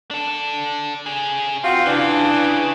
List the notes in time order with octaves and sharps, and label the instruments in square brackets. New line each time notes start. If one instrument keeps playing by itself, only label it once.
[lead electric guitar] D4 A4
C#3 G#4
[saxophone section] C4 F4 F#4
[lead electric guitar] C#3 [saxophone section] E3 D4